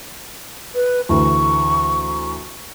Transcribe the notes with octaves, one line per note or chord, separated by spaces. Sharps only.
B4
D2 E3 C#6